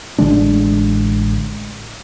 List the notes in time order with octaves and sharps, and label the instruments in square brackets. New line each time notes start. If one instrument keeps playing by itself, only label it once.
[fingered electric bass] A1 D3 G#3 D4